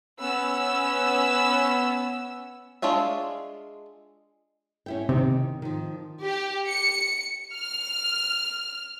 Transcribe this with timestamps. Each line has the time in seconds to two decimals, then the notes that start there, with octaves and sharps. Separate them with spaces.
0.20 B3 C#4 E6
2.82 G#3 D4 F4 C#5 E5
4.86 C#4 E4 G5
5.09 C3 D#3
5.62 D#3 F3
6.23 G4
6.67 C#7
7.53 F6